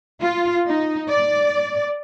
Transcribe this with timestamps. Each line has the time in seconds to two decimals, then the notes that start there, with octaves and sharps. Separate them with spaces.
0.21 F4
0.67 D#4
1.10 D5